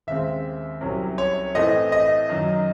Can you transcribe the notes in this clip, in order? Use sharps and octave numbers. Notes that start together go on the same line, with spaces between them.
D#2 C#3 G#3 C4 E5
C2 C3 F#3 C#4
C#5
A2 E3 A3 C4 D#5
D#5
F#2 D#3 F#3